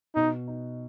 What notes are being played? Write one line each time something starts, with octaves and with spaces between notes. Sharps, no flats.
B2 D#4
D#4